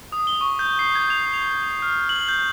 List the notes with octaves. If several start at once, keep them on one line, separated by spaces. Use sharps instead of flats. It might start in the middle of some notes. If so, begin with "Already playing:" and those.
D#6
G7
C#6
G6
C7
G#6
F7
F7
F6
F#7
G6